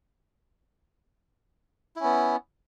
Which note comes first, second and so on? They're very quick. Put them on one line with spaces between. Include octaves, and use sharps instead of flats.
E4 C#4 B3